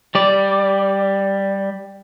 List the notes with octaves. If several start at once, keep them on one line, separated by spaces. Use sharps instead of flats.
G3 D5